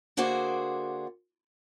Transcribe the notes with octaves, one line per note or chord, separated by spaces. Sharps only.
D3 A#3 F#4 G#4 C5 D5